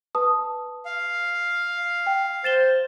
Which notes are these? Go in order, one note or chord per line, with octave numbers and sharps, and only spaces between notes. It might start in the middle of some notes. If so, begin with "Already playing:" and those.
B4 A5 D#6
F5
G5
C5 A6 E7 G7